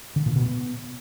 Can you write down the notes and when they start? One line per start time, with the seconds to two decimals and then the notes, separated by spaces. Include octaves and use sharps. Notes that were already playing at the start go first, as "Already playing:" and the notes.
0.16 D3
0.26 A#2
0.36 B2
0.46 B3